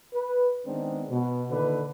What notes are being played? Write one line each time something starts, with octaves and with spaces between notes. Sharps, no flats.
B4
D#3 G#3 B3 C4 D4
B2
A#2 D3 D#3 B4